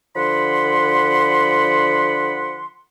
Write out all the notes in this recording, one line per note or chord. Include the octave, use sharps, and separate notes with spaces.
D3 F3 F#5 B5 C6